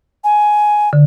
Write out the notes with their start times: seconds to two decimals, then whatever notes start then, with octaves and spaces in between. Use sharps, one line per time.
0.24 G#5
0.93 D3